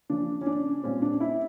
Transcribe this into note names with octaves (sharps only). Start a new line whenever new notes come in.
C#3 F3 A#3 C#4 D4
C#4
D4
A#2 G3 C4 C#4
D4
E4